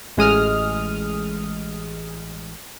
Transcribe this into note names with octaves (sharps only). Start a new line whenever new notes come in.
A1 G#3 D#6 F6